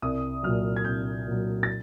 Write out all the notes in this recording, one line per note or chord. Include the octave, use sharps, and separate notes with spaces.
C2 D#6
A#2 F#3 F6
G#6
C2 G6
A#2 F#3
A6